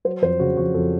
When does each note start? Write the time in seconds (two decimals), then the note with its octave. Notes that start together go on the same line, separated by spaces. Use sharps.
0.05 F#3 C5
0.22 F2 C5
0.40 C#3 F#4
0.57 F2 F#4
0.74 F2 A4